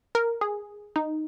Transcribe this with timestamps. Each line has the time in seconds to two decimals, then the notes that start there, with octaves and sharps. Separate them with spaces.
0.15 A#4
0.41 G#4
0.96 D#4